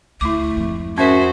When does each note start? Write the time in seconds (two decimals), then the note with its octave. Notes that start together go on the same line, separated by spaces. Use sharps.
0.21 D2 A3 E4 D6
0.57 F2 G#2
0.98 C#4 F#4 G#4 A#4 C5 E5